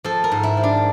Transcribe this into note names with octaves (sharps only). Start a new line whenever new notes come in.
F3 A4
A#4
G#2
E4
F3
D4